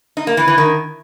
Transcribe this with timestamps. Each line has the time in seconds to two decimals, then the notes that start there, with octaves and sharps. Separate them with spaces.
0.17 D#4
0.27 A#3
0.37 E3
0.48 E3
0.58 D#3